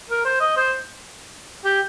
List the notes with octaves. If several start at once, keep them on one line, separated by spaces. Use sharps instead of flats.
A#4
C5
D#5
C5
G4